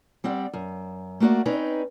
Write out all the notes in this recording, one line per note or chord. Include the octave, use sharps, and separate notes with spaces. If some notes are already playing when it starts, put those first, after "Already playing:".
G3 C4 D5 F#5
F#2
A3 A#3 F#4 D5 F#5
C4 C#4 D#4 B4 D5